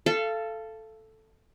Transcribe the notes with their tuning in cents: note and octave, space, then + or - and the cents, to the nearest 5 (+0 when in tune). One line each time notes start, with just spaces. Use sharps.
A4 +0 F5 -30